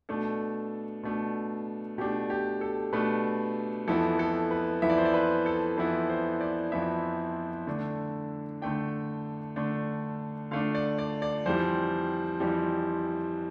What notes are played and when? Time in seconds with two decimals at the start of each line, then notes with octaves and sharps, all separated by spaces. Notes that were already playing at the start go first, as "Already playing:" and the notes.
0.09 B2 A3 D4 A4
1.03 B2 A3 D4
1.98 B2 A3 D4 G4
2.30 G4
2.61 A4
2.93 B2 A3 D4 B4
3.88 F2 E3 B3 E4 A4
4.19 A4
4.51 B4
4.82 F2 E3 B3 E4 E5
4.90 D5
4.98 C5
5.05 D5
5.14 B4
5.46 A4
5.78 F2 E3 B3 E4 B4
6.09 C5
6.41 D5
6.72 F2 E3 B3 E4 E5
7.67 D3 A3 D4
8.62 D3 A3 D4 G5
9.56 D3 A3 D4
10.51 D3 A3 D4 F5
10.75 D5
10.98 D5
11.22 D5
11.46 F2 E3 G3 C5
12.40 F2 E3 G3